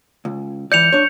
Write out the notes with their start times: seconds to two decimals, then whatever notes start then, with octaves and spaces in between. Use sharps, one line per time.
0.25 C#2
0.72 E3 D5 G6 C#7 F7
0.93 D4 C#5